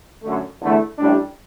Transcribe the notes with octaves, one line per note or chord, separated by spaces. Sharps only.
F#2 D3 A3
E2 D3 A3 E4
A1 A2 G3 D4